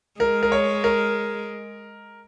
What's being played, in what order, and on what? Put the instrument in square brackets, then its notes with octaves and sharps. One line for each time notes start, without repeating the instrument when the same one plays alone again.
[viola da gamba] G#3 [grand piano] A#4
[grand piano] A#4
C#5
A#4